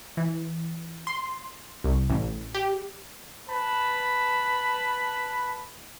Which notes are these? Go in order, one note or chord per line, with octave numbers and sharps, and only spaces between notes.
E3
C6
C2
A1
G4
B4 A5 B5